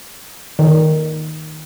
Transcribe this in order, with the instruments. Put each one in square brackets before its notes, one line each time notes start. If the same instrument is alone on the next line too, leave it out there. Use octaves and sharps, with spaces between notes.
[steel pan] D#3